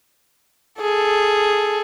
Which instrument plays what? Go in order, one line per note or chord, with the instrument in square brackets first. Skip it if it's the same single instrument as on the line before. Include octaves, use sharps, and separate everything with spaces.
[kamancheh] G#4 A4